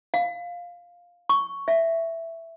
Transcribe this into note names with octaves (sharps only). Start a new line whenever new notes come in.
F5
C#6
E5